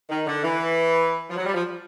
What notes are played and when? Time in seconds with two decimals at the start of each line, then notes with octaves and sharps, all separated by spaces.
0.10 D#3
0.27 D3
0.44 E3
1.29 F3
1.37 F#3
1.45 G3
1.55 F3